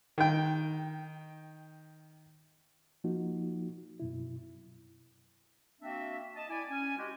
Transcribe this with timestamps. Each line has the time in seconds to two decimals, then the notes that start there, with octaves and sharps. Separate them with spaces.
0.18 D#3 G5
3.04 F3 A#3 D#4 F#4
4.00 F#2 B2 E4
5.81 A#3 C4 D4 F#4 E5
6.35 D#5 A5
6.50 E4 D5 G#5
6.69 C#4 G#5
6.98 G#3 F#4 G4